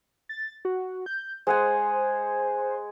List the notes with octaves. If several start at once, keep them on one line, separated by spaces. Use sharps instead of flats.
A6
F#4
G6
G#3 C5 F#5 G#5